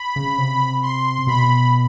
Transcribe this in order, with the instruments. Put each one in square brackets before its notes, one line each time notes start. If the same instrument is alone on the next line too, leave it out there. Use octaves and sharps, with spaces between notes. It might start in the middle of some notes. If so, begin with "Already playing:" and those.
Already playing: [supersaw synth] B5
[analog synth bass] C#3
C3
[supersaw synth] C6
[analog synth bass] B2 [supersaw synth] B5